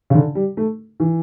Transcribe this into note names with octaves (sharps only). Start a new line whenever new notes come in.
C#3
D3
G3
A3
E3